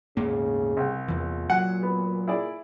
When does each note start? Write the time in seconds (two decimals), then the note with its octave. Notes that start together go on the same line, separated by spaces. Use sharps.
0.17 D#1 G#2 C#3 A#3
0.77 C2 G5
1.08 E2 A#2 E3
1.50 F#3 F#5 G#5
1.83 B3
2.28 E4 G#4 D5